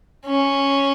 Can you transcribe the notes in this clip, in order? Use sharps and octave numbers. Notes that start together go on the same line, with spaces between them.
C#4